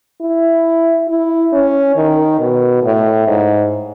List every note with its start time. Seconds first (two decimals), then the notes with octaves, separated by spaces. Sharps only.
0.21 E4
1.08 E4
1.53 C#4
1.96 D#3
2.39 B2
2.83 A2
3.27 G#2